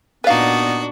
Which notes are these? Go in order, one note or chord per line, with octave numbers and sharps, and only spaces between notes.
A#2 B3 D4 D#4 F#4 B4 F5 A6